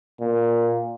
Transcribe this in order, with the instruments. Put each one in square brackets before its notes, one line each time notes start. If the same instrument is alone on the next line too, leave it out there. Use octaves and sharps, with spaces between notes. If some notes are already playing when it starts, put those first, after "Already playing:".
[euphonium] A#2